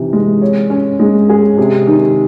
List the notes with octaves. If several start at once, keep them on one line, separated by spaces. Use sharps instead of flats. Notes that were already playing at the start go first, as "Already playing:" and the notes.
Already playing: C3 E3 D#4
G#3
C#5
C#4
G#3
G#4
C3
D#3